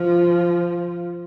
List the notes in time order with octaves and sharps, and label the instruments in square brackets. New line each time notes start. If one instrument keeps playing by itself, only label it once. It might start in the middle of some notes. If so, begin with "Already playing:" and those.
Already playing: [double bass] F3